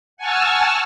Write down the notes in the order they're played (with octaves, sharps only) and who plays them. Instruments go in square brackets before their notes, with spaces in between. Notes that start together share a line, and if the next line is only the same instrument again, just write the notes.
[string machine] F#5 G#5 A5 C#6 E6 F6